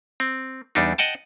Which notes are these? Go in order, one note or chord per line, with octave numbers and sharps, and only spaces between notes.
C4
E2 G3 D4 D#4
D#5 F#5 G5 A5